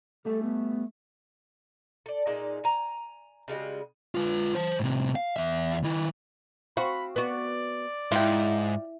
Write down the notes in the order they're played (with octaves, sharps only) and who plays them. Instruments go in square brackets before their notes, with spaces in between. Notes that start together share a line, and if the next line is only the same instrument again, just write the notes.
[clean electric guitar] G3 A3 E5 [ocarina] A4
[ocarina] B3
[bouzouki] A4 D5
A#2 G#3 D#4 D5
G#5 A#5
C#3 G3 G#3 F#4
[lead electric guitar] F4 B4
C5 A5
A2 C3
F5
E2 E5
D#3 E4
[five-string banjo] C4 F5 [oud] F#4 [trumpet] B5
[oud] B3 F#4 [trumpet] D5
[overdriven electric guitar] G#2 [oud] E4 [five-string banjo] F4 G5